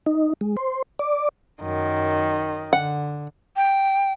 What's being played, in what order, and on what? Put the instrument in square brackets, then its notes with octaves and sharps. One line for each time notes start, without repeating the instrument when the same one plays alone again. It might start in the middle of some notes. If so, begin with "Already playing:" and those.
[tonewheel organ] D#4
G#3
C5
D5
[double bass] F#2 [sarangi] D#3
[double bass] D3 [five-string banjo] F#5
[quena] G5